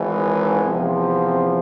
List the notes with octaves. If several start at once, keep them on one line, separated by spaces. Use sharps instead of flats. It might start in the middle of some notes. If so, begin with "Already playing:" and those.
Already playing: G#1 G#2 E3
E2 C3 F3
C4